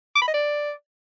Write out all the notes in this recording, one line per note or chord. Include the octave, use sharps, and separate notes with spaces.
D6
B5
D#5
D5